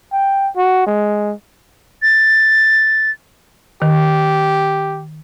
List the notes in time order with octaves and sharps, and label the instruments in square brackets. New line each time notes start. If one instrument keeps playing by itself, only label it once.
[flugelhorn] G5
F#4
G#3
[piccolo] A6
[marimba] D#3 [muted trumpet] G4